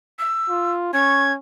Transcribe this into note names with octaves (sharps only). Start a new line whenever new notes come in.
E6
F4
C#4 C#6 G#6